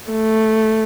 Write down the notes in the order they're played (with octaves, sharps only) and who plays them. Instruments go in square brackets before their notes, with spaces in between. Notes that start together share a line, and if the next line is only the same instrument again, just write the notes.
[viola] A3